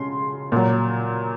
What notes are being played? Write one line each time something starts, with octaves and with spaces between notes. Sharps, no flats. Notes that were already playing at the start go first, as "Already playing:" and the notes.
Already playing: C#3 C6
A#2 F#3